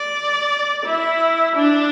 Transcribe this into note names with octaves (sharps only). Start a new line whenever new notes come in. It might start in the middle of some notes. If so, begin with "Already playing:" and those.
Already playing: D5
E4
D4